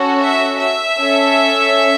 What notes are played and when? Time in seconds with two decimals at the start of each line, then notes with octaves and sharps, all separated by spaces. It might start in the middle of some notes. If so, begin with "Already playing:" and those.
Already playing: C#4 F#4 A4
0.19 E5
0.59 E5
0.99 C#4 A4